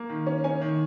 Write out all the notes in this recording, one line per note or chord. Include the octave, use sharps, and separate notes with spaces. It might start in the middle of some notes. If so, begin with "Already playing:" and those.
Already playing: A#3
D#3
C#4
C#4 G#5
D#3